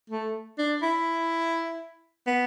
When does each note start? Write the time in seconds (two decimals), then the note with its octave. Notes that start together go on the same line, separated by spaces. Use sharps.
0.10 A3
0.58 D4
0.82 E4
2.27 B3